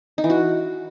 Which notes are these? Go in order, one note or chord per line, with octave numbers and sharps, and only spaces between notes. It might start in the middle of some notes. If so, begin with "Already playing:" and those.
D#4
E3
F#4